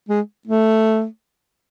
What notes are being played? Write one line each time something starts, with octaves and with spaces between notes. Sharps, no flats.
G#3
A3